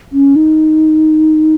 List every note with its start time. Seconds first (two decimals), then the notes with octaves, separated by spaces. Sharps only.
0.12 C#4
0.36 D#4